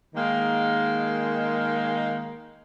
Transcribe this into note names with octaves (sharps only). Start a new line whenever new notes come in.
D#3 G#3 A#3